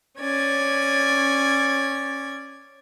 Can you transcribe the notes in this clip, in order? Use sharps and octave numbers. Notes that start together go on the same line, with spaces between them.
C#4 D5 G#6